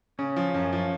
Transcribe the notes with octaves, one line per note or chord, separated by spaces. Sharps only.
C#3 C#4
F3
F#2
F3